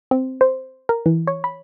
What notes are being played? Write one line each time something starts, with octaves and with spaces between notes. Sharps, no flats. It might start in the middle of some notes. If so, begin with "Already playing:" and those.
C4
C5
A#4
E3
C#5
B5